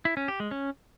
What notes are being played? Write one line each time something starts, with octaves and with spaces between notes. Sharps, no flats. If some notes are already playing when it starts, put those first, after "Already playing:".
E4
C#4
G4
G#3
C#4